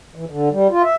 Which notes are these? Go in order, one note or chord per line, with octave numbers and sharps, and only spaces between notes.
E3
D3
G3
F4
E5